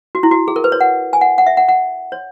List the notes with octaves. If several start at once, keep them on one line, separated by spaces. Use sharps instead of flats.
F#4
E4
F#4
G#4
A#4
B4
C#5
F#5
G#5
F#5
F#5
E5
F#5
F#5
C#5